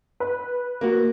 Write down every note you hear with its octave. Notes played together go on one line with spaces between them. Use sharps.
B4
A#3 F#4